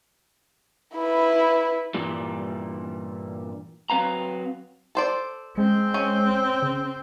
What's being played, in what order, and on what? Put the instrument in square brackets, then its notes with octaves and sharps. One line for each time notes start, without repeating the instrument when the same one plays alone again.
[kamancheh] E4 B4
[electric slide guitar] G2 A#2 E3 G3
F#3 C4 B4 F5 A#5
[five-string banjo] A4 C5 D5
[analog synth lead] G#3 [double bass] C4
[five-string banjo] C#4
[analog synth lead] C#3